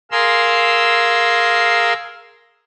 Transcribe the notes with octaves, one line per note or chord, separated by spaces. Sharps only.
G#4 A#4 F5 C6 E6